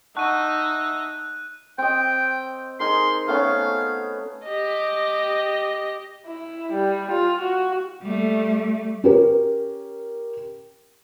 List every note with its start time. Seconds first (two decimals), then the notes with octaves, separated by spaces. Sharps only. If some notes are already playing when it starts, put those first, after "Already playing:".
0.17 D#4 E5 F#5 A5 C#6 F#6 D#7
1.78 C4 D#5 G5
2.80 D#4 G#4 A#4 C6
3.28 A3 B3 C#4 F5
4.45 G4 D#5
6.26 E4
6.73 G3
7.12 F4
7.41 F#4
8.03 G3 A3
9.04 C#4 G4 A#4